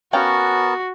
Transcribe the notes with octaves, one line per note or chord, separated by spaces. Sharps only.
B3 C#4 F#4 A#4 F5 G5 A5